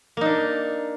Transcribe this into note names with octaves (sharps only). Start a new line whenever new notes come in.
A#3 D4 D#4